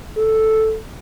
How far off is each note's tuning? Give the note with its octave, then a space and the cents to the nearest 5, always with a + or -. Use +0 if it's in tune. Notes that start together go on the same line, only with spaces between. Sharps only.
A4 +0